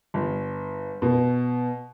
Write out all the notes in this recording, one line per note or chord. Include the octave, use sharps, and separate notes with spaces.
G1
B2